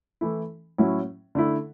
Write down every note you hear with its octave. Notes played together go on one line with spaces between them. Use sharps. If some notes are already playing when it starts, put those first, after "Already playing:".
E3 A3 E4
A2 F#3 C#4 E4
D3 A3 E4